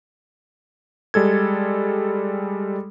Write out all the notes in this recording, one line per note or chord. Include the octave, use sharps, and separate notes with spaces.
G3 G#3 A4 G#6